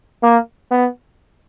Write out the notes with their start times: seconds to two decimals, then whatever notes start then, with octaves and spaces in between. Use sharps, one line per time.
0.23 A#3
0.71 B3